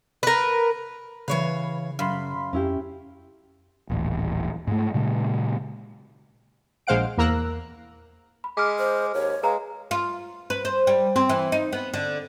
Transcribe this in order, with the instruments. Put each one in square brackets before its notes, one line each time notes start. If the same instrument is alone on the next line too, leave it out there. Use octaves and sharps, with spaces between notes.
[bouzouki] A#4 B4
[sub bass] C#3 [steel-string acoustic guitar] E3 C#5 F5 [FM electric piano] B4
[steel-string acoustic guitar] F#2 [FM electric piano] F5 B5 C6
[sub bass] F2 [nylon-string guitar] C#4 E4 G4
[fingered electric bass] D#1 A1
G#2 A3
A#2 C#3 G#3
[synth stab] A#1 G#3 C5 F5 F#5 D7
E2 A#3 A#4 A#5 E6 F#6
[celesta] B5
[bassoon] G#3 [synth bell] D6 F6
[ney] C5
[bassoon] D#2 [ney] C#5
[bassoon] G#3 [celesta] B4 A#5 [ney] F5
[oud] F4
B4
C5
G3
C4
E3
D#4
B3
D3